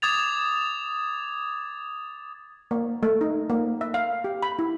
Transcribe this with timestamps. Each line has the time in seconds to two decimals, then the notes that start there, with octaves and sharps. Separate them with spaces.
0.02 D6 D#6 G#6 A6 F7
2.71 A#3
3.03 A3
3.21 D#4
3.50 A#3
3.81 E5
3.94 F5
4.24 G4
4.43 B5
4.59 E4